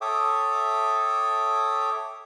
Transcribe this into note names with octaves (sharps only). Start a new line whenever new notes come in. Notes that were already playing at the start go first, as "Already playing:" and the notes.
A4 C#5 E5 G5 D6 D#6